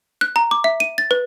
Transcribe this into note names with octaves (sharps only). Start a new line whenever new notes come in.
F#6
A#5
D6
E5
D#7
A6
B4